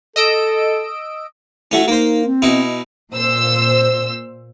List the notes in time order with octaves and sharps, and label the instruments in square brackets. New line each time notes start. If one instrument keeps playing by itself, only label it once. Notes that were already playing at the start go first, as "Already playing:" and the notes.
[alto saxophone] A4 [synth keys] D#5 E6 D7
[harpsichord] F#3 A3 C#4 [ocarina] E4
[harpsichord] A#3 C5 [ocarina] D#4
[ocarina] C4
[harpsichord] B2 D#4 E4
[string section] A#2 C5 E6